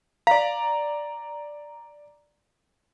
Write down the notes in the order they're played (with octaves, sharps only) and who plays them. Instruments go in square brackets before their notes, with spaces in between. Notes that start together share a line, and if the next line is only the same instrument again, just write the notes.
[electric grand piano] D5 A#5 [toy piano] F5